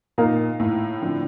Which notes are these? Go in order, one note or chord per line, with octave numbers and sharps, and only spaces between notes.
A#2 A#3 D#4 A#4 F5
A2
D3 F3 C4